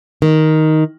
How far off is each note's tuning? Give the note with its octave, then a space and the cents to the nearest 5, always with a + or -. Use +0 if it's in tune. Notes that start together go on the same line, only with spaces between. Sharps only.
D#3 +5